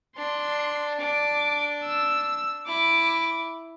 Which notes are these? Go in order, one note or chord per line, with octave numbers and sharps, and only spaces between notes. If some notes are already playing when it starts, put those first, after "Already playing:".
D4 C6
D4 D6
E6
E4 D6